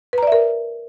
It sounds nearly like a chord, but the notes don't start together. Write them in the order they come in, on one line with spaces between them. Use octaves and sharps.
B4 A#5 D5 E5 A#4